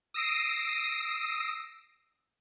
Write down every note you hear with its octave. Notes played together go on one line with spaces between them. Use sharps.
D#6 E6 A#6 C7 D7 D#7